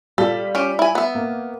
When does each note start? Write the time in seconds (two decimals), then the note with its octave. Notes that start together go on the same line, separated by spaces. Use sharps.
0.18 G3 F4 A4
0.55 C#4 G4
0.79 E4 G#5
0.95 B3 E5
1.15 A#3